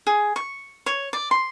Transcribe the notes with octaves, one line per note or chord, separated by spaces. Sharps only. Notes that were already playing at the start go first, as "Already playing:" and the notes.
G#4
C#6
C#5
D5
C6